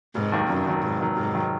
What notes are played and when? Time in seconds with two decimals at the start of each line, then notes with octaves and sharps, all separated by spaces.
0.15 F1 G#2
0.32 D#2 D#3 F#3
0.48 F1 F#2
0.66 D#2 D#3 F#3
0.83 F1 G#2
1.00 D#2 D#3 F#3
1.17 F1 G#2
1.34 D#3 F#3